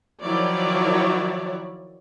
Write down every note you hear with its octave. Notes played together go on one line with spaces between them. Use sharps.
D#3 F3 F#3 E4 C#5 D5